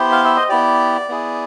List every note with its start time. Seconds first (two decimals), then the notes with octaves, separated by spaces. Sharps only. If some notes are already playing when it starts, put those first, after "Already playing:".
Already playing: B3 E4 G4 C5
0.12 F5
0.24 E5
0.37 D#5
0.49 B3 E4 G4 D5
1.09 B3 E4 G#4